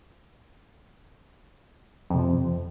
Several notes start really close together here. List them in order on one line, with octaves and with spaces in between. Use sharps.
F2 C3 F3